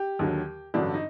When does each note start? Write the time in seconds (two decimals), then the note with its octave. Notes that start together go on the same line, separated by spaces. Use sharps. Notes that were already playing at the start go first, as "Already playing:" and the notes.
Already playing: G4
0.19 D#2 D3 F#3
0.74 A1 G2 D3 F#3 D4
0.94 D#4